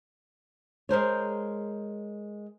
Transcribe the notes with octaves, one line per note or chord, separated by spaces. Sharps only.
G#3 A#4 C5 C#5